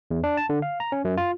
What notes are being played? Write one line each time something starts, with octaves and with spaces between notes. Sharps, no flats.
E2
D4
A5
D3
F5
A#5
C#4
F#2
F4